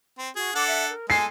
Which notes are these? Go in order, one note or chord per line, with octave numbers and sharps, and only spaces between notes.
C4
F#4 G#4
D4 A4 F#5 D6
E5
A#4
G#3 A4 G#5 C7